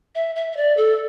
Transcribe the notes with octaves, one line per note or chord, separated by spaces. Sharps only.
E5
E5
E5
D5
A4